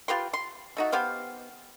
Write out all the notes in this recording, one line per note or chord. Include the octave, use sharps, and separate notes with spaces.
F4 G4 B4 C6
C6
A3 D#4 F#4
B3 G4 C5 F5